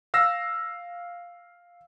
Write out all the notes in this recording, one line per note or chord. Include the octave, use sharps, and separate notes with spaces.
F5 E6 A#6